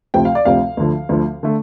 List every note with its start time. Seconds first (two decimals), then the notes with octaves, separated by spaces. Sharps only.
0.14 D2 C3 F3 G5
0.25 F5
0.35 D5
0.45 D2 C3 F3 F5
0.77 D2 D3 F3
1.09 D2 D3 F3
1.43 D3 A3